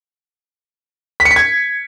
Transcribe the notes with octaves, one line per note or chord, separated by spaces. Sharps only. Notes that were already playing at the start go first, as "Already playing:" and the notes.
B6
C#7
B6
G#6